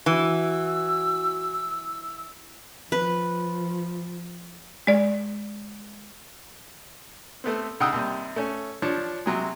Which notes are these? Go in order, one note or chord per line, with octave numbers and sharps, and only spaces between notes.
E3 F#4 E6
F3 B4
G#3 D5
A3 B3 C4
C#3 D#4 F#5 G5 D#6 E6
D#2 C3 G3
A3 C#4
F3 D4 C#5
C3 F#3 G#3